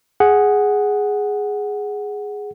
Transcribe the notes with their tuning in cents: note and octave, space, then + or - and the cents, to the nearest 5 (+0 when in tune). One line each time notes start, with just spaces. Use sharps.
G#4 +0 F#5 +0